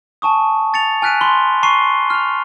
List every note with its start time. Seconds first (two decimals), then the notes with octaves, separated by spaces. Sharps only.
0.22 G#5 A5 C#6 D#6
0.74 A6 C#7 F7
1.02 G#5 F6 F#6 B6 D7 D#7
1.21 B5 C6 G7
1.63 A#5 C#6 C7 D#7 G7
2.10 F6 F7